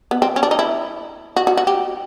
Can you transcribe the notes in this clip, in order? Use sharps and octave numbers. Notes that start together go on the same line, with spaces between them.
B3
C4
C#4
D4
D#4
E4
F#4
F#4
F#4
G4